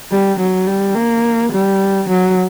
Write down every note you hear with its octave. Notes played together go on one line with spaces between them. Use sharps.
G3
F#3
G3
A#3
G3
F#3